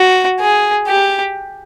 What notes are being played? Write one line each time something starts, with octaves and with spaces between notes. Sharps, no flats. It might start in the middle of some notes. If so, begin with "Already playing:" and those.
Already playing: F#4
G#4
G4